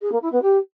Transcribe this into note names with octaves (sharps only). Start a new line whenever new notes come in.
G#4
A#3
E4
B3
G4